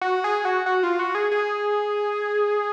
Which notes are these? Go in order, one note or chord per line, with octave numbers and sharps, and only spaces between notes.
F#4
G#4
F#4
F#4
F4
F#4
G#4
G#4